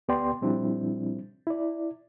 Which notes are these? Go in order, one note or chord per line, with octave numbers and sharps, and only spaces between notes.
D2 B3 G4 D5 G5 C6
A#2 F3 G3 C4 D4 E4
E4 D5